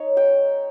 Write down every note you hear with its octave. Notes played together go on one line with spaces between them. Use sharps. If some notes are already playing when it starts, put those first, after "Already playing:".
Already playing: D#4 C#5
G#3 G5